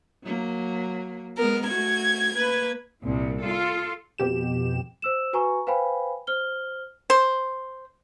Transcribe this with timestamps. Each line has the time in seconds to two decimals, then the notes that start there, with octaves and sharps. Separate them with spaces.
0.24 F#3 A#3
1.38 G#3 B3 A#4
1.67 A3 F#4 G#6
2.33 A#3 B4
3.02 C2 A#2
3.41 F4 A4
4.18 F2 B2 G4 E7
5.02 C5 E6 E7
5.33 F#4 B4 G#5 A#5 C#6
5.67 B4 C5 F5 G5 G#5 B5
6.27 C5 F6 G7
7.10 C5